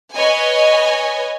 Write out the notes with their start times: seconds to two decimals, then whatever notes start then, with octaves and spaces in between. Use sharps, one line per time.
0.15 B4 C#5 D#5 G#5